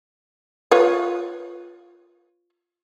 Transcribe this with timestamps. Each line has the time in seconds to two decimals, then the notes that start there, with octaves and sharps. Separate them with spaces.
0.71 F4 B4 C#5